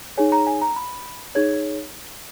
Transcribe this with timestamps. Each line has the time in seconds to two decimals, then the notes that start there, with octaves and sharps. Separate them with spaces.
0.17 D#4 G#4 C#5 G#5
0.32 A#5
0.47 G#5
0.61 A#5
0.76 B5
1.35 D#4 G#4 C#5 G#6